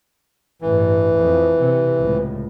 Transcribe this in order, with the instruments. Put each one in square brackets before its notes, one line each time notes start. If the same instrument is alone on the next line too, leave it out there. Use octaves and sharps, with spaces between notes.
[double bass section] A1 G2 [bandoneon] E3
[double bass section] F2
C3
C#2 A2